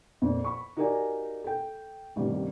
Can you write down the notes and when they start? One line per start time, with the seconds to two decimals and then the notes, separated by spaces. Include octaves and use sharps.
0.22 F2 A#2
0.44 B5 C#6
0.77 D#4 F#4 G4 A#4 D5 G#5
1.44 A4 G5
2.16 A1 G2 C3 D#3